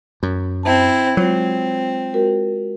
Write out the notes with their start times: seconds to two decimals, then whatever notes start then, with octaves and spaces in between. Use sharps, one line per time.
0.23 F#2
0.63 C4 E4 A5
1.17 F#3 G#3 C4 F4
2.14 G#3 F#4 A#4